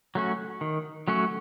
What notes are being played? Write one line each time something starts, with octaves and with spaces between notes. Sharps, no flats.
F#3 A3 C#4 F#4
D#3
F#3 A3 C#4 F#4